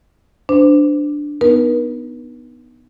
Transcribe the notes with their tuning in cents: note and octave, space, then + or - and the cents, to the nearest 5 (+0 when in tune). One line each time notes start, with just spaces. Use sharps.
D4 +0 C5 -30
B3 +0 D#4 -15 A#4 +45